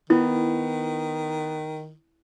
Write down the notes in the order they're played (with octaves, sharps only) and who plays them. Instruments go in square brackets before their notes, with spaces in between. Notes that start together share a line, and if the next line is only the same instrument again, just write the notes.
[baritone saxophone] D#3 [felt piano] B3 [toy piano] E4